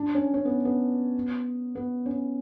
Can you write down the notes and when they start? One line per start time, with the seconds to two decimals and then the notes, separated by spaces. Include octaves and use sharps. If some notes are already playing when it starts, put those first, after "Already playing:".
Already playing: D4
0.14 C#4
0.34 C#4
0.45 B3
0.65 B3
1.75 B3
2.06 C#4